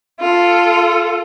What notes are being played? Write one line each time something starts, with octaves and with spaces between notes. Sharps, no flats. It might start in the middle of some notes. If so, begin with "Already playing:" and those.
F4 A4